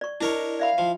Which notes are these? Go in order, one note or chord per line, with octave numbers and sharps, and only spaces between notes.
D5 C#6
D4 E4 A#4 C#5 D#5
D5 E5 F5 B5
F3 G5